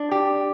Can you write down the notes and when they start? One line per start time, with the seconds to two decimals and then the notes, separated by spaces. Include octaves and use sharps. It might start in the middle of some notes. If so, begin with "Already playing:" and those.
Already playing: D4
0.11 G4